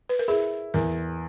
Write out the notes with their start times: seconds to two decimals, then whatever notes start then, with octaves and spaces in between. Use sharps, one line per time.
0.09 B4
0.19 A#4
0.28 E4 G#4
0.74 E2 A#4